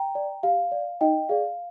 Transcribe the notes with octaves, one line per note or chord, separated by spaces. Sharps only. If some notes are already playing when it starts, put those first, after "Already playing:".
Already playing: G5 A#5
D5
G4 F5
D5
D#4 D#5 G5
G#4 D5 F5